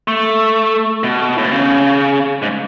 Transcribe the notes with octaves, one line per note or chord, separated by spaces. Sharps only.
A3
B2
A2
B2
C#3
G#2